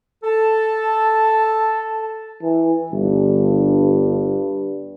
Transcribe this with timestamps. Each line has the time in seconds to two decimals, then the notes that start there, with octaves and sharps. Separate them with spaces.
0.24 A4 A5
2.43 E3
2.92 G1 G2